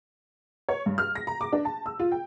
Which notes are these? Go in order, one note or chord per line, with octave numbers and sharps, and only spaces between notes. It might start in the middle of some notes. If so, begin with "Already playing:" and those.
C#5
G2
F6
A#6
A#5
D6
D4
A5
E6
F4
G5